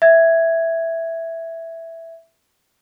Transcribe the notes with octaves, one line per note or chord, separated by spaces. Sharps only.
E5 G#6